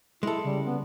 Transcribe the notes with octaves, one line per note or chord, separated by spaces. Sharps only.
G#3 E4 A4
C#3 G3
B3